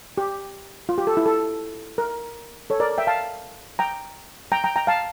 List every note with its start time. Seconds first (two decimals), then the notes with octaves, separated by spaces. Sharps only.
0.18 G4
0.89 F4
0.98 G4
1.07 A4
1.17 E4
1.26 A4
1.98 A#4
2.70 A4 C#5
2.80 A#4 D5
2.98 E5 G5
3.07 F5 A5
3.79 G5 A#5
4.52 G5 A#5
4.64 G5 A#5
4.76 G5 A#5
4.87 F5 A5